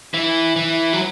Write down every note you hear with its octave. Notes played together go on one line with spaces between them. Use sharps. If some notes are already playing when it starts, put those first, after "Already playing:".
E3
E3
F#3